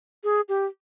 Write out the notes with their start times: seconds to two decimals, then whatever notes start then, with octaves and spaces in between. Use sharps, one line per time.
0.24 G#4
0.49 G4